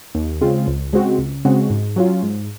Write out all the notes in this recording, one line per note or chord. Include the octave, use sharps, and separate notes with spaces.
D#2
C#3 G#3 C4 F4
C#2
C#3 G#3 C4 F#4
C#2
C#3 G#3 C4 F#4
G#2
F#3 C#4 F4
G#2